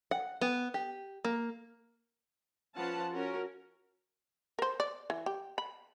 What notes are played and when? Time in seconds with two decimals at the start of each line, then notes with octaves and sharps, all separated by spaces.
0.11 F#5
0.41 B3
0.74 G4
1.25 A#3
2.75 F3 C#4 F4 B4 F#5 A5
3.10 C#4 F#4 A#4
4.59 A#4 C5
4.80 D5
5.10 E3
5.26 G4
5.58 B5